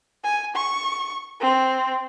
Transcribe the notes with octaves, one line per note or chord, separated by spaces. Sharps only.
G#5
C#6
C4